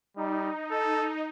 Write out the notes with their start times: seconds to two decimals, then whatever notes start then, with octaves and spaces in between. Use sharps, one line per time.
0.17 G3 D#4
0.71 A4